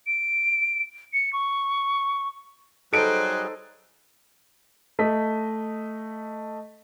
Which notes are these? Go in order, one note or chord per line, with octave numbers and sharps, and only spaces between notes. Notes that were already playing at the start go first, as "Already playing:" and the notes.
D7
C#7
C#6
F#3 G3 D#4 G#4 A4 C5 F#6 D7
A3 D#5 B6